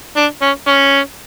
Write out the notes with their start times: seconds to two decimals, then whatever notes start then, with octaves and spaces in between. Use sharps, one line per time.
0.17 D4
0.42 C#4
0.67 C#4